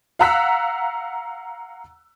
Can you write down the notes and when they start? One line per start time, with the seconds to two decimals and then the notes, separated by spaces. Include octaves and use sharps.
0.19 F5 F#5 A#5 E6 F#6 B6